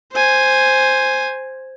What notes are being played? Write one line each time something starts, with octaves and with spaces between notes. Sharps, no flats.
C5 G#5